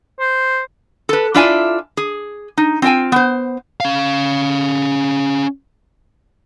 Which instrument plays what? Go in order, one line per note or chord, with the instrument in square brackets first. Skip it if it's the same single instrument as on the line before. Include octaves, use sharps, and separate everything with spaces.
[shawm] C5
[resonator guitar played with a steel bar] A4 B4
D4 E4 F4 D5 E5 G#5
G#4
D#4
C4 F4 D5 G5 G#5
B3 C5
[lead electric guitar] C#4 F5